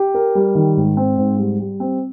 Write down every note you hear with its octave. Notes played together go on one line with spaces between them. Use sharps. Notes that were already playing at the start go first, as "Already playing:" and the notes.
Already playing: G4
A#4
G3
D#3
G#2
C4
G#2
G3
G3
C4